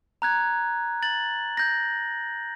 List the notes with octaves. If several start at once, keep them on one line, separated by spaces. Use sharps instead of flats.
A#5 F#6 G#6
A6 F#7
G6 A#6